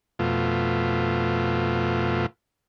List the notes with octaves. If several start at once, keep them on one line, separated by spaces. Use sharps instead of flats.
F2 B2 A3 F4